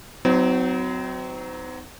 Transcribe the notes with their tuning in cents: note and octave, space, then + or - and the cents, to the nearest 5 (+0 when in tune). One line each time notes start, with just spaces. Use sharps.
F#3 +0 C4 -35 D#4 +30